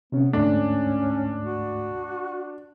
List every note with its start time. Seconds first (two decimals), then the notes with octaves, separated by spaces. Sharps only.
0.12 C3 B3 C#4
0.33 D2 G#2 A3 C#4 D4
1.44 F#4